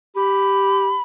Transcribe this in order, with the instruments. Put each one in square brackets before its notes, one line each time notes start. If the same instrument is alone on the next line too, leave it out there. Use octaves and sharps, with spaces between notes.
[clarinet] G4 [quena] B5